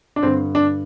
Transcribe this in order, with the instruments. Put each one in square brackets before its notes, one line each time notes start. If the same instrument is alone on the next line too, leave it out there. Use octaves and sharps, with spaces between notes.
[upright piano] D4
G2 D3 C4
D4